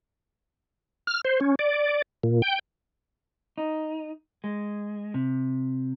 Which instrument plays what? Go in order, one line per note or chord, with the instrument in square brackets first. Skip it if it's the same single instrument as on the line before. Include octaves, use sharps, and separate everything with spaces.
[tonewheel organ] F6
C5
C#4
D5
A#2
G5
[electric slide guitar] D#4
G#3
C3